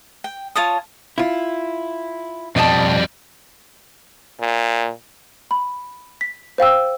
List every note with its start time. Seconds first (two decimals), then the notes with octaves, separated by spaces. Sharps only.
0.24 G5
0.55 F4 C#5 A5 D#6
1.18 E4 F4
2.56 F2 B2 G3 D#5 A5
4.40 A#2
5.51 B5
6.21 B6
6.58 C5 F5 G5 E6